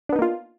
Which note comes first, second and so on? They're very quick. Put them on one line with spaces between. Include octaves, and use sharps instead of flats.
D4 B3 D#4 A#3 F4